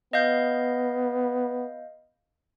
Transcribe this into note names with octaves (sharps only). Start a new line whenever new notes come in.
B3 D#5 F5 G6